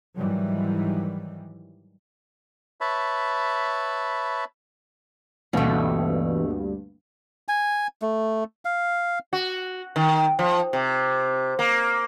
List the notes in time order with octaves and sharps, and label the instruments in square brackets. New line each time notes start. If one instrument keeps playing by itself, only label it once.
[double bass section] G#2 D#3 E3 F#3 G3
[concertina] B4 C#5 E5 A5 B5
[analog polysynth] D2 G2 [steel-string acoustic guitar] B2 A3 [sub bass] E3 [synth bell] A#3 C4 F5
[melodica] G#5
A3
F5
[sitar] F#4
D#3
F3
C3
A#3